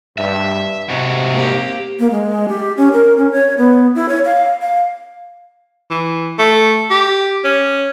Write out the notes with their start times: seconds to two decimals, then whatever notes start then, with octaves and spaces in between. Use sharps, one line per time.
0.18 G2 E5
0.89 G#2 C3 F#3
1.33 A#3 C4 G4
2.00 A#3
2.11 G#3
2.49 G4
2.77 C#4
2.93 A#4
3.17 C#4
3.32 C#5
3.58 B3
3.95 E4
4.09 C#5
4.25 F5
4.62 F5
5.91 E3
6.39 A3
6.91 G4
7.45 C#4